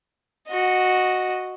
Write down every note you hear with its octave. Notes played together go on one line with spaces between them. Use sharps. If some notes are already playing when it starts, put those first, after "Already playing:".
F#4 D#5